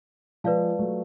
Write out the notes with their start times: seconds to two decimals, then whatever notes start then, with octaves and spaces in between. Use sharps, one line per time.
0.44 F3 G#3 F4 B4 D5 F5 A5
0.79 F#3 A3